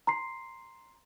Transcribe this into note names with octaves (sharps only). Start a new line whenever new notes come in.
A#5 C6 C7